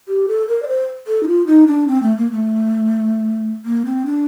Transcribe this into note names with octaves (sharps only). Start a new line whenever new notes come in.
G4
A4
A#4
D5
C5
A4
D#4
F4
D#4
D4
C4
A3
A#3
A3
A#3
C4
D4